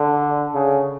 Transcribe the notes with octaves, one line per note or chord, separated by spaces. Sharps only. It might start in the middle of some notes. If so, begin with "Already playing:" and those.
Already playing: D3
C#3